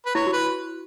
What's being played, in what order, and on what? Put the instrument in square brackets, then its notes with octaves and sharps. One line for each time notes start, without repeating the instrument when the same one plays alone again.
[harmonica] B4
[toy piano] E4 [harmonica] C#5
[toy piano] F#4
[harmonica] B4